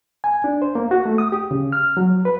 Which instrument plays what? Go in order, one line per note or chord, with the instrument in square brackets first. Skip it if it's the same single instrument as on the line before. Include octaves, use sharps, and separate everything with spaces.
[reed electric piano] G#5
D4
C5
A#3
F#4
A3
D#6
G4
C#3
F6
F#3
B4